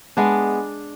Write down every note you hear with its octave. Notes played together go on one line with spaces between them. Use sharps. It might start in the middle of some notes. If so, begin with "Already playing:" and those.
G#3 B3 D4